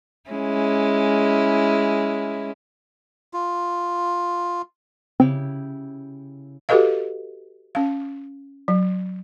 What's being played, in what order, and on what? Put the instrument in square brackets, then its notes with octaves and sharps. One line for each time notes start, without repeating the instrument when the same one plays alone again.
[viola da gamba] G#3 C#4 E4
[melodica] F4
[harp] C#3 E4 G4 [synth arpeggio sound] C4
[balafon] F#4 G4 A4 B4 D#5 F5
C#4 F5
F#3